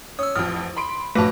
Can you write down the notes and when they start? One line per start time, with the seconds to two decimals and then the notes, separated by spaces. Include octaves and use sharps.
0.19 C#4 D#6 E6
0.36 A1 F2 D#6 F6
0.76 B5 C6 D7
1.15 A#1 F#3 A3 B4 A5 D6 A#6